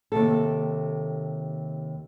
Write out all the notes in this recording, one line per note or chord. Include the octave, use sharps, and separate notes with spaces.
D#2 C3 A4